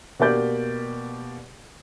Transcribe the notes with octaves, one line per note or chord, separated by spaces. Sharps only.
B2 A#3 G4 D5 G6